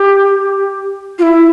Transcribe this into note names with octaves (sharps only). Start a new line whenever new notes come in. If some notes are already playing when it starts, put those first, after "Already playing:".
Already playing: G4
F4
E4